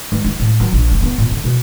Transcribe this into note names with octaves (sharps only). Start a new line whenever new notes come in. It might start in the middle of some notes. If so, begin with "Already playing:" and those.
G#3
E4
A2
F#3
A#1
F1
B3
A#2
D3
B2